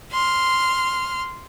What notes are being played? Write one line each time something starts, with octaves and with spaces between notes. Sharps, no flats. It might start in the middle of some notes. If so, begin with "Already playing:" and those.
C6 F6